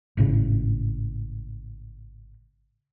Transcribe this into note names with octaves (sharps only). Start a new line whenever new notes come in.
G#1 A2 C#3